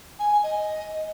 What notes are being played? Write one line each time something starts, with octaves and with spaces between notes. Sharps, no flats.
G#5
D#5